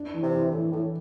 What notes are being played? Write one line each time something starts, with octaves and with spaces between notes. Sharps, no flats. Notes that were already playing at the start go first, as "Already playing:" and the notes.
Already playing: D4
E3
C3
E3
A2 E3
A2 E3